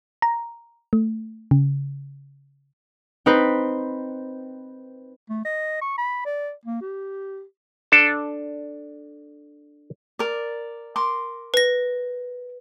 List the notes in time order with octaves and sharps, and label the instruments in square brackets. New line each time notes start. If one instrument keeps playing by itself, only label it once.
[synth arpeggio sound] A#5
A3
C#3
[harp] C4 D#4 B4 C5
[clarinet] A3
D#5
C#6
B5
D5
A#3
G4
[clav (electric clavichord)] D4 A4 A5
[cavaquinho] A#4 D5
A#4 C6 D6
[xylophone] B4 A#6